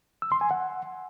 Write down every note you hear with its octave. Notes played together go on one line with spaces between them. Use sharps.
E6
C6
G#5
F#5